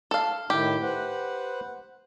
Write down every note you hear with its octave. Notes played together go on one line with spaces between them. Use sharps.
A4 F5
A2 D#3 E4 G4
B4 C5 F#5